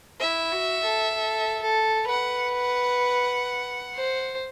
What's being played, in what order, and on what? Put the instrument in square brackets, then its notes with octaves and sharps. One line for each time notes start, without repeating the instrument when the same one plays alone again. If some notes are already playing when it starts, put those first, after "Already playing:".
[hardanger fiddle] E4 [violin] E5
[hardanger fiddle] F#4
A4
A4
A4
[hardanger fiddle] B4 [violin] F#5
[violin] F#5
[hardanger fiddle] C5